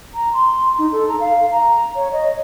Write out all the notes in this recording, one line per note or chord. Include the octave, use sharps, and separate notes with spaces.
A#5
C6
D#4
A4
A#5
F5
A#5
C#5
D#5